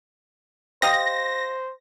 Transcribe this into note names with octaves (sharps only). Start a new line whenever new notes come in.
G4 C5 D#5 F5 A#6